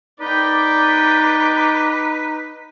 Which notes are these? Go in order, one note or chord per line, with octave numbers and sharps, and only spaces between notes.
D#4 B4 D5 G5 D6